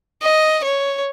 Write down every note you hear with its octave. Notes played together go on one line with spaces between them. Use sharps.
D#5
C#5